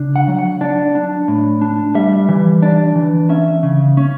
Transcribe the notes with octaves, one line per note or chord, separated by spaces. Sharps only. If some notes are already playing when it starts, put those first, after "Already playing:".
Already playing: C#3 D4
F#5
F#3
F#5
D4 D5
D4
A2
D4
G3 E5
E3
D4 D5
E3
C#4 E5
C#3
C#4